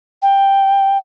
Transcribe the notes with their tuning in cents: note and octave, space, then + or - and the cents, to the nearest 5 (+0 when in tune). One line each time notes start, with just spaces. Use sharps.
G5 +5